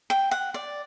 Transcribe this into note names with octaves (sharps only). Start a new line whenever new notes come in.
G5
F#5
D5